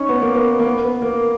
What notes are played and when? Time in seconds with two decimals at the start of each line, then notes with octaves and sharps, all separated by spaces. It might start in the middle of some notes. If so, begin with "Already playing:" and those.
Already playing: C#4 D#4
0.09 B3
0.22 A#3
0.35 B3
0.59 A#3
0.65 B3
0.83 B3
1.02 A#3